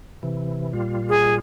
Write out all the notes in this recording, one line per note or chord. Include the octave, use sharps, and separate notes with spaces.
C3 E3
A#2 G3 F4
G#4